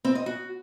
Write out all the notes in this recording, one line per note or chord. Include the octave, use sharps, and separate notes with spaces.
C4
D#5
F#4